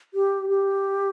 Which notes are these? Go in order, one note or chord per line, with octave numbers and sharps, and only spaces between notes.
G4
G4